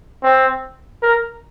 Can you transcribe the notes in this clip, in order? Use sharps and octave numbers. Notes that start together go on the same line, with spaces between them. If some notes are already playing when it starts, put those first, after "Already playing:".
C4
A#4